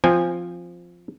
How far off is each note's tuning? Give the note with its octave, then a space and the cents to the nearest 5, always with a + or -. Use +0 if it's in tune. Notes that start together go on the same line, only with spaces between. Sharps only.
F3 +0 C4 +0 G#5 -15